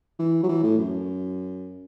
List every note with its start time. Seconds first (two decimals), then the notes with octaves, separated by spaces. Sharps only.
0.19 E3
0.43 F#3
0.49 E3
0.63 A2
0.79 F#2